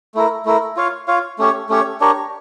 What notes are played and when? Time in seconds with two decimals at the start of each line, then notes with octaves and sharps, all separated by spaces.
0.15 A3 E4 A#4
0.45 A3 E4 A#4
0.77 F4 C#5 F5
1.08 F4 C#5 F5
1.38 A3 C#4 G4 C#5
1.69 A3 C#4 G4 C#5
2.00 D4 G4 A#4 C#5